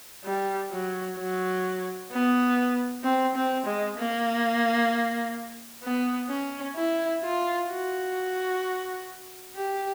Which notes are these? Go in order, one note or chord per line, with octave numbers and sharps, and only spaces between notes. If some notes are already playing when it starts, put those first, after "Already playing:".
G3
F#3
F#3
B3
C4
C4
G#3
A#3
B3
C#4
E4
F4
F#4
G4